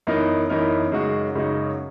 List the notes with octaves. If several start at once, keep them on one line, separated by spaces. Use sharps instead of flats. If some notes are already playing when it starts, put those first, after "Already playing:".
F#2 E3 B3 D#4 A#4
F#2 E3 B3 D#4 A#4
F#2 C#3 G#3 D#4 F#4
F#2 C#3 G#3 D#4 F#4